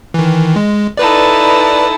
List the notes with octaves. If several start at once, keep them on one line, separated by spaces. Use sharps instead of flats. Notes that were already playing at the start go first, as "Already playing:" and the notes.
D#3 E3
G#3
D#4 E4 A4 B4 D5